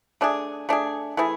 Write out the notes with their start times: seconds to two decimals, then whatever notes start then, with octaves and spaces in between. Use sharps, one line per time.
0.21 A3 D4 G#4
0.69 A3 D4 G#4
1.17 E3 A3 E4 G#4